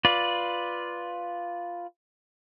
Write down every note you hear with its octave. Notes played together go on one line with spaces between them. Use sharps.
F4 B4 D5